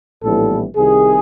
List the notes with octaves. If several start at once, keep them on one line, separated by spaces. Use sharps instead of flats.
A#1 A2 E3 G3 B3 A4
C2 C3 D#3 G#4